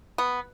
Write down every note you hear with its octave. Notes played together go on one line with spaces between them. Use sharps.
B3